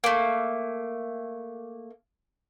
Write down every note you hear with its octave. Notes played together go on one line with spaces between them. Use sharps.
A3 A#3